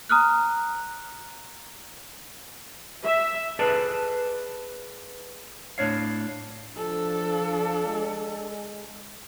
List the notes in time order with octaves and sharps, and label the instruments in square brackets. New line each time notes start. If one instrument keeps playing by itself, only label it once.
[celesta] A#5 D#6 F6 F#6
[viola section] E5
[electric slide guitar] G#4 A4 B4 D5 A5
A2 D4 C#5 F5
[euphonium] F3 [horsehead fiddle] D4 A4
[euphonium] G#3